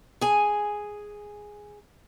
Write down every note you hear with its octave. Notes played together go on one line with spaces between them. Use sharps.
G#4 G#5